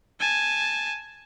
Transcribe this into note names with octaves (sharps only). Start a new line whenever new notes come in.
G#5 A5